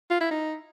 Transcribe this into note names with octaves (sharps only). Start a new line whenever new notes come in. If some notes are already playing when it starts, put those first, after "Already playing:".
F4
E4
D#4